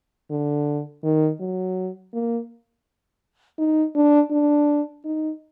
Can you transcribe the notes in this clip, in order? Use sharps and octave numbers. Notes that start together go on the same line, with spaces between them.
D3
D#3
F#3
A#3
D#4
D4
D4
D#4